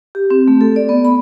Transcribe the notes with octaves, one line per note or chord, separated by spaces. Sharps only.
G4
C4
A3
A4
D5
B3
B5